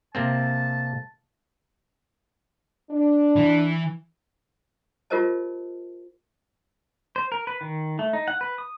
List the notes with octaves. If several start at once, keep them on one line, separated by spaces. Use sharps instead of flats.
C3 A#3 C4 A5
D4
E3
F4 G4 A#4 C5 D#5 A5
C5
A#4
B4
D#3
A3
D#4
F#5
B4
D#6